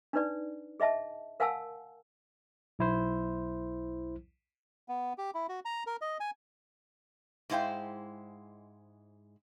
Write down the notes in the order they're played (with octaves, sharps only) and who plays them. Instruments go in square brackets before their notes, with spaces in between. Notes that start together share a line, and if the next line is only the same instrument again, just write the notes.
[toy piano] D4 D#4 B4 D5
G#4 D#5 E5 A5
A#4 F5 F#5 G#5 A5 E6
[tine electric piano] B1 E4 C5
[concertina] B3
G4
E4
F#4
A#5
A#4
D#5
G#5
[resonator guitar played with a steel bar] G#2 G#3 E4 C5 F5 G5